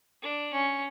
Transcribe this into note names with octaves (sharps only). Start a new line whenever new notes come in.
D4
C#4